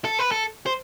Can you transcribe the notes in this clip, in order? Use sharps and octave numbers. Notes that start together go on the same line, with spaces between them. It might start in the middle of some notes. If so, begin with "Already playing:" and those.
A4
B4
A4
C5